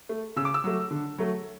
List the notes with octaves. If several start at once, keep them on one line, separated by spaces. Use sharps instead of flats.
A3
C#3 E6
D6
E6
F#3 A3
D3
F#3 A3